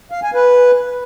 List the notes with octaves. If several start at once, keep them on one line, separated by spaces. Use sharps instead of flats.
F5
G#5
B4